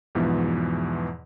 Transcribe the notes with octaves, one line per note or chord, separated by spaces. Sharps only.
E2 G#2 B2 E3 F3